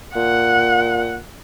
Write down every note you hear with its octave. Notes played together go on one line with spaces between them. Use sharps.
A#2 F#5